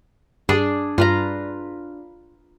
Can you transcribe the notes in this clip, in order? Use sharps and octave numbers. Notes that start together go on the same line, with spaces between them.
G2 D4 G#4 D5
G2 F4 B4 A#5